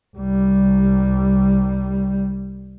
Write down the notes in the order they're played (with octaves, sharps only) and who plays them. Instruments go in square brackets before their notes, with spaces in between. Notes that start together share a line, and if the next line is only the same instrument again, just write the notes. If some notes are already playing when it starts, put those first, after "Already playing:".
[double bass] C2 G3